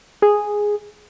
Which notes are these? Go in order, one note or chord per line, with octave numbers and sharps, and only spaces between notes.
G#4